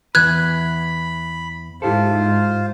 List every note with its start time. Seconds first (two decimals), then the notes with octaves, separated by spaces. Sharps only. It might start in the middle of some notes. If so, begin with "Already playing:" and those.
0.15 E2 E3 B4 B5 F#6 G#6
1.82 G#2 E4 F4 G4 A4 C5